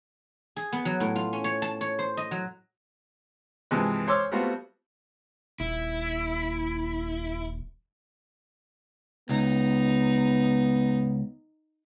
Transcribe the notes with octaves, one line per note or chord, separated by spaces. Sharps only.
G#4
B3
F#3
A2
F4
C#4
C#5
A5
C#5
C5
D#5
F#3
G2 C3 E3 F3 G#3
C5 C#5 C6 D6 E6 F6
G3 A3 B3 C4 F4 F#4
D#1 E4
C#2 B3 D#4